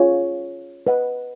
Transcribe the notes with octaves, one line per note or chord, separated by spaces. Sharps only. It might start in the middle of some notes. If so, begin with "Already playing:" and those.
Already playing: C#4 F4 G#4 C#5 G#5
B4 D#5 F#5